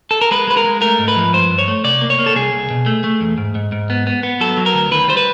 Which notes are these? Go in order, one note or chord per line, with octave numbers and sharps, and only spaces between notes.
A4
A#4
G#3 B4
G#3 B4
A#4
G#3
A3 A#4
G#2
B4
F3
G2 C5
G2
C#5
A3
C3 D5
A#3
C#5
A#3
A4
C2 G#4
C2
B2
A3
A3
E2
G#2
G#2
G#2
B3
B3
B3
F#3 A4
F#3
A#4
D2
D#3 B4
G3 C5
B4